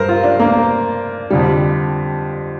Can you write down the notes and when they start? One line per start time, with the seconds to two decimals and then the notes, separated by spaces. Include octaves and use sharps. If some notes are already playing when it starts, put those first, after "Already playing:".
Already playing: G2 G3 A#4 C5
0.09 F4
0.24 D4
0.40 A#3
1.30 F2 D3 G3